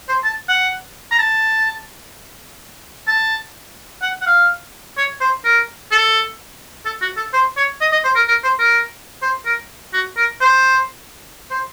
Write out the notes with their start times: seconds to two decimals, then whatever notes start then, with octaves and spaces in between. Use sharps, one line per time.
0.09 C5
0.24 A5
0.48 F#5
1.11 A#5
1.19 A5
3.07 A5
4.02 F#5
4.21 F#5
4.27 F5
4.97 C#5
5.21 C5
5.44 A#4
5.92 A4
6.85 A4
7.02 F#4
7.17 A4
7.33 C5
7.57 C#5
7.81 D#5
7.93 D#5
8.04 C5
8.16 A#4
8.28 A#4
8.44 C5
8.59 A#4
9.22 C5
9.46 A#4
9.93 F#4
10.17 A#4
10.41 C5
11.51 C5